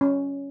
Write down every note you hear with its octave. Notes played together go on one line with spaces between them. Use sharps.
C#4